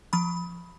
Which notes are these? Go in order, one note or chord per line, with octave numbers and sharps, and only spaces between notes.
F3 B5